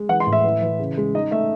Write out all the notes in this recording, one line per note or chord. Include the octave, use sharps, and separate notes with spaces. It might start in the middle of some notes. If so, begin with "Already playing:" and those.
Already playing: G#3
E3 F#5
C6
A2
E5
E3
E3
C#3
G#3
D#4 D#5
A3 E5